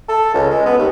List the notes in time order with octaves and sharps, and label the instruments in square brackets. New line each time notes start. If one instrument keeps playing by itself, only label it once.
[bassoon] A4
C#2
G#3
B3
D#2